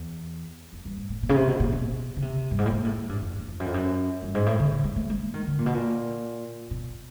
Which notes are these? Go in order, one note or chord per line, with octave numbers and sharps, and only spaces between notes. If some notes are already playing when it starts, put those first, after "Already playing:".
Already playing: E2
F2
G2
G#2
A2
A#2
C#3
C3
B2
A#2
B2
C#3
C3
G2
G#2
A2
A#2
A2
G#2
G2
F2
E2
F2
F#2
F2
F#2
G2
G#2
A2
D3
D#3
G#3
A3
G#3
G#3
D#3
D3
A#2
B2
A#2
B2